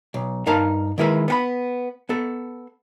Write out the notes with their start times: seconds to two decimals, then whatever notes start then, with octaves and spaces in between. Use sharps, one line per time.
0.14 B1
0.46 G2 D#4 A#4 F5 A5
0.98 D#3 G#3 E4 A#4 B4
1.28 B3 F#5 B5
2.09 B3 A4